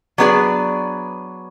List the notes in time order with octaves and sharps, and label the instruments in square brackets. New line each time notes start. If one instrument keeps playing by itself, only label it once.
[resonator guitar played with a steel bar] F#3 B3 D4 G#4 D5